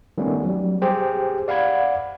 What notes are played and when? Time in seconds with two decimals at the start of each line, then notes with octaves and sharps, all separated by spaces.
0.18 D#3 G3 A3 B3 C#4
0.44 F#3 G3
0.82 G4 G#4 C5 G5
1.48 D5 F5 F#5 B5 G#6